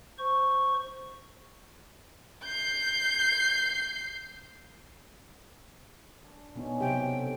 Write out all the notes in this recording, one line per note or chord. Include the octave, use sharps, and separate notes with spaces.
C5 C#6
G6 C7
D4
F#2 B2 B3 C#4 D#4 C6
C3 F#3 C5 G5
D3 C4 A4